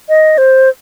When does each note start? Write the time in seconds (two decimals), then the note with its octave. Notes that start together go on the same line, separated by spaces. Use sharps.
0.09 D#5
0.38 C5